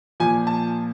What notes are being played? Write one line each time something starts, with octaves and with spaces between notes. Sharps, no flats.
A#2 F3 G#5
A5